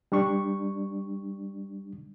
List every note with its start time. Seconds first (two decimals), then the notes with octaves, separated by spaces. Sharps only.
0.12 G3 D4 C#6